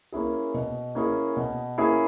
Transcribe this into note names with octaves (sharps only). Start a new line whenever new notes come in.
A#3 C#4 E4 G#4
B2
A#3 C#4 E4 G#4
B2
A#3 C#4 E4 G#4